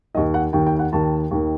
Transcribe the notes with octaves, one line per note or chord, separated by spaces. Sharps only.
D#2 D#3 D#5
F#5
D#2 D#3 G5
G5
F#5
D#2 D#3 A5
D#2 D#3